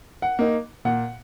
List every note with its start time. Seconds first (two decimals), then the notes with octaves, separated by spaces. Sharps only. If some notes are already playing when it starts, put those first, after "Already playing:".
0.22 F#5
0.39 A#3 D#4
0.85 A#2 F#5